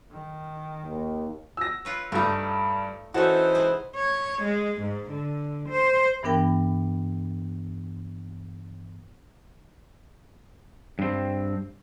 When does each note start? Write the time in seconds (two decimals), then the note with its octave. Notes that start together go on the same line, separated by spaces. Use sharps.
0.11 D#3
0.85 D#2
1.57 E6 A#6
1.85 F4 B4 C#5
2.12 G2 G3 A3 D#4
3.14 E3 C#4 D#4 F#4 A4 C5
3.55 C3 G#3 B3
3.96 C#5
4.43 G#3
4.81 G#2
5.11 D3
5.69 C5
6.23 G2 E3 B3 D4 A#4 G5
10.99 G2 C4